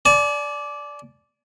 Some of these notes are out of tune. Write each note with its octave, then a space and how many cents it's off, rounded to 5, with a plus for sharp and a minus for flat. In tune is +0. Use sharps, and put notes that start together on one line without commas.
D5 -10 G#5 +45